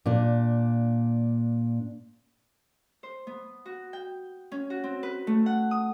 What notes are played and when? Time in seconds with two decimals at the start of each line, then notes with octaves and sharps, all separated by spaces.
0.06 A#2 D4
3.03 C5
3.27 B3
3.65 F#4
3.93 G5
4.52 C#4
4.70 F#4
4.84 C4
5.03 B4
5.27 A3
5.46 F#5
5.71 D#6